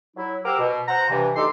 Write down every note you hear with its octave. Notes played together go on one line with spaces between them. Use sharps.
F#3 E4
G4 A#4 C5 F#5 D6 E6
B2
C5 F#5 A#5
G2 C3 E3
D2 D#3 D#4 G4 A4 C6